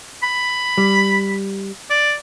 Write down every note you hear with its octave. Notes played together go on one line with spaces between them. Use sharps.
B5
G3
D5